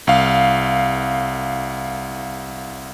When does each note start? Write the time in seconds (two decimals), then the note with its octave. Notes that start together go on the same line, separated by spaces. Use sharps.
0.07 C2 F5